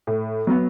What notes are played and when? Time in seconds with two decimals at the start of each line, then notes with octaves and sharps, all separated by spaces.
0.07 A2
0.47 F#3 B3